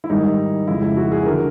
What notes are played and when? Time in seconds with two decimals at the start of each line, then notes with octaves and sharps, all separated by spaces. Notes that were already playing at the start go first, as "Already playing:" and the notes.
0.04 E4
0.10 G#2 D#3 G3 D#4
0.67 F2 C#3 F3 G#3 E4
0.82 E4
0.97 F#4
1.12 G#4
1.26 D3 F#3 A#4